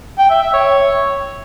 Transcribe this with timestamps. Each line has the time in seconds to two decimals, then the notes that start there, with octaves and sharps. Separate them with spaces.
0.18 G5
0.30 E5
0.42 E5
0.53 C#5